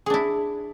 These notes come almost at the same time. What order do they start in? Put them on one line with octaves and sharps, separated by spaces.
G#4 D4 E4